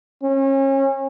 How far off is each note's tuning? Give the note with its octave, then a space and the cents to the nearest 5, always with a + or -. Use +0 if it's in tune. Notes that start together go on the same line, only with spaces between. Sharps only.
C#4 -35